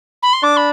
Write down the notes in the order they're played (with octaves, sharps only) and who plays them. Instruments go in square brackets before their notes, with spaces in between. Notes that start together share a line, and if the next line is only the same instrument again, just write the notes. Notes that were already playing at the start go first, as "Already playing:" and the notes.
[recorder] B5
C6
[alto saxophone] D4 [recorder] D6
[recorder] B5